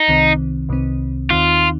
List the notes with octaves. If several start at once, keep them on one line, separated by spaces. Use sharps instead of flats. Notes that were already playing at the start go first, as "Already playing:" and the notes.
Already playing: D#4
C2 C3 D#3 C4
C2 C3 D#3 C4
D#2 D#3 C4 D#4 F4